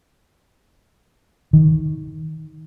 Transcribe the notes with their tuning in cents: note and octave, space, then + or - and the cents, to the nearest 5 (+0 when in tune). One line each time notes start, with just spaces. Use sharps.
D#3 +15